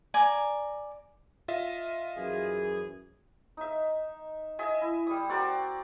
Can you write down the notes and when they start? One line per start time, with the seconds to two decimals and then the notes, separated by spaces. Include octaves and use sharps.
0.14 D5 G#5 A#5
1.48 F4 D#5 E5
2.17 F#2 E3 G#4
3.57 D#4 E5
4.59 D#5 E5 G#5
4.82 E4
5.07 G3 D#6
5.29 C4 F#4 A#4 D5